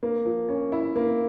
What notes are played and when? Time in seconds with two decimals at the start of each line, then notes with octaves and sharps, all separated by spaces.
0.03 A#3
0.25 F3
0.49 C#4
0.72 E4
0.96 A#3